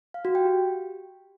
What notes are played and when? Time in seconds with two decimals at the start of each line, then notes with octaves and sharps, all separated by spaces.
0.14 F5
0.25 F#4
0.35 G5
0.45 G4